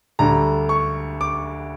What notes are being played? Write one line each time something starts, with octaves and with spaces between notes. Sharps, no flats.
D2 D3 G3 A#5
C#6
D6